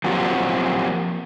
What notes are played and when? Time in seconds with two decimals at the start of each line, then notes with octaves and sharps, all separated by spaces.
0.04 F3 F#3 A#3 C4 F#4 G4